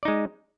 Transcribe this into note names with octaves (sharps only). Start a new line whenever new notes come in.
G#3 D#4 D5